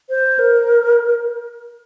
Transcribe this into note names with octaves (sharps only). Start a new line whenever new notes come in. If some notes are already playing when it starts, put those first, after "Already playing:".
C5
A#4